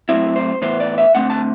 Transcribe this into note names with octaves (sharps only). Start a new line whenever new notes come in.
A2 F#3 C4 E4
C5
A2 E3 B3 C5
D5
E5
D3 A3 C4 F#5
A5